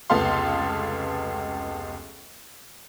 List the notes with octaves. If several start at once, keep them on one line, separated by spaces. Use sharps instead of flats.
F1 C#2 B3 A4 F5 C6